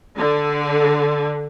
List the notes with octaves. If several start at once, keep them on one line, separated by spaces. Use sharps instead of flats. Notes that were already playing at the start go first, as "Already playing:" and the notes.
D3